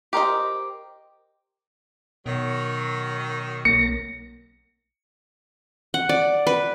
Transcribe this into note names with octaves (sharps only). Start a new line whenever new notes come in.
G4 A#4 C5 D#5
B2 D#3 F#3
B1 A#3 A#6 C#7
F#5
D5
B4